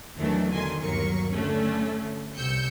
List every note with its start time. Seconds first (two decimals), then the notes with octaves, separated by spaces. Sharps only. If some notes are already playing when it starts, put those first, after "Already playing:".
0.17 E2 D#3 E3 F#3 A3 D4
0.50 D3 D#3 G#5 C6
0.79 G1 D#2 F#3 A#4 C#6
1.30 D3 A3 C#4
2.36 C2 E6 G6 C#7